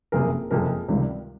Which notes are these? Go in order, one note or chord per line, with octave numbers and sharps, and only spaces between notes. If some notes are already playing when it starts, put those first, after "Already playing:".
F#1 F2 C3 G#4 A#4
F#1 F2 C3 G#4 A#4
C#2 C3 D#3 G3